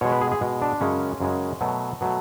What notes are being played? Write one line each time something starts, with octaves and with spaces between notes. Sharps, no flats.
B2 G#3 C#5
B4
G#4
G#4
B2 G#3
D4
F#2 C#3 G#3 C#4
F#2 C#3 G#3
B2 F#3 A3
B2 F#3 A3